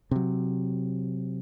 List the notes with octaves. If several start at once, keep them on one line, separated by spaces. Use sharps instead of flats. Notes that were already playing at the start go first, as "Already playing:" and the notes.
C3 F#3